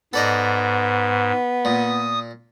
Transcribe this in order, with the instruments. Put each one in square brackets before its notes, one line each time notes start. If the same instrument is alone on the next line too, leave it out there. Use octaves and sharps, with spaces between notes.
[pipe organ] G#2 [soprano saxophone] B3 [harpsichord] A4 D5 D#5
[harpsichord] A#2 [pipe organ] D#6